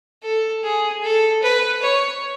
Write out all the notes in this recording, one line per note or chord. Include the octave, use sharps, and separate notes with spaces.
A4
G#4
A4
B4
C#5